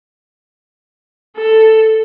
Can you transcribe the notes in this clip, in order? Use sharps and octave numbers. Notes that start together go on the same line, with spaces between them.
A4